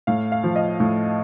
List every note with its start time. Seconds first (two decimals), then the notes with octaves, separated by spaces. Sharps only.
0.07 A2 F5
0.32 F5
0.44 F3
0.56 D#5
0.80 A2